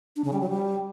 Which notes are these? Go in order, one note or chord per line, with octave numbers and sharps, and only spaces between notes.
D4
C#3
G3
F#3
G3